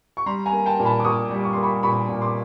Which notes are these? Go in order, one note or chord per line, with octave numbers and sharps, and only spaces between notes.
C#6
G3 A#5 C6
G#5 A#5
A#3
G5 A5
A#2
A5 B5
D6
A#2 C#6 D#6
G3
C#6
A#3 C6
B5 C#6
A#2 B5 C#6
A#2
C6 D6